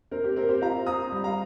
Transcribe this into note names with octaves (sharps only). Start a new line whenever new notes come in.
C4 A#4
G4
C4 A#4
G4 C5
F4 F5 A#5
C4 A#5 D#6
G3
F5 A#5